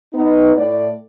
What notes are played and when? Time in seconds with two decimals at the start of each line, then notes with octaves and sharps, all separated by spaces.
0.14 B3 D#4
0.55 A2 D5